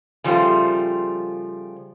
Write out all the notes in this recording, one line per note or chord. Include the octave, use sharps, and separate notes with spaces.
C#3 F3 G3 A3 F4 C5